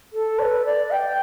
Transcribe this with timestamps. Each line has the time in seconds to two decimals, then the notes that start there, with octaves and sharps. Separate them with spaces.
0.13 A4
0.39 D5
0.42 B4
0.65 D5
0.91 G5